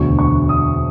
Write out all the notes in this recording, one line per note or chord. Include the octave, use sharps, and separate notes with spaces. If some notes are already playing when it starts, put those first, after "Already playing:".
Already playing: E1 D2 D3 C#6
C#6
D#6